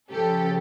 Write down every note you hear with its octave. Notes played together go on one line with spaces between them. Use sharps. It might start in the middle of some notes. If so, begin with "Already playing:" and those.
C#3 F3 G4 A4